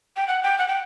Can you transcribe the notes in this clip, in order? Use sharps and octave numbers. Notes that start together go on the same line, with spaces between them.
G5
F#5
G5
F#5
G5